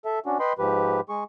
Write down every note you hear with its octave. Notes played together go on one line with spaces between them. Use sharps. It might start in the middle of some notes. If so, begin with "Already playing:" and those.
A4 E5
C#4 D4 F#4
B4 D#5 G5 B5 C6
G#2 F3 G4 B4
G#3 G#4 C#6